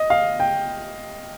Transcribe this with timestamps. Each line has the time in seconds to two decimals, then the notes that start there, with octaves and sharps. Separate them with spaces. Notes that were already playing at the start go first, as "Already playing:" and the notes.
Already playing: D#5
0.10 F5
0.40 G5